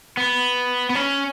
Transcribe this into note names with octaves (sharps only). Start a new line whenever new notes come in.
B3
B3
C#4